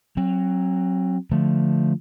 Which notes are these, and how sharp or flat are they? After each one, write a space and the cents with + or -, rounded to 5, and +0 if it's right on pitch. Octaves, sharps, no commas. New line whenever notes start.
F#3 +0 C4 +35
D3 +0 F3 +0 A3 +0